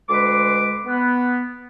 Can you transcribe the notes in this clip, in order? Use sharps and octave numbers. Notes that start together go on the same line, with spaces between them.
D2 G#3 B4 C6 D6
B3